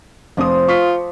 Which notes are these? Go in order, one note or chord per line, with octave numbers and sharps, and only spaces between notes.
F1 F3 C4 D6 D#6
F4 C#6 B6